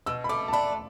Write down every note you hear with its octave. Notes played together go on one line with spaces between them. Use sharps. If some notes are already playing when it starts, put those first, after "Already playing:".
B2 E6
B5
A3 D6
A5
D4 B5